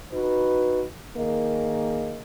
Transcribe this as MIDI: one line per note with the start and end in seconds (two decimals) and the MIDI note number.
0.12 0.85 63
0.12 0.85 66
0.12 0.85 71
1.17 2.22 51
1.17 2.22 58
1.17 2.22 68
1.17 2.22 75